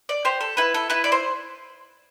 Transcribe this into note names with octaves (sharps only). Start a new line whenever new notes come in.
D5
G4 C5
A4
E4 B4
A4
E4 B4
D5
C5